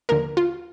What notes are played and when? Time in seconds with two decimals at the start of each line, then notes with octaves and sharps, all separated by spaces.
0.09 D#2 D3 F3 A#3 A#4
0.37 F4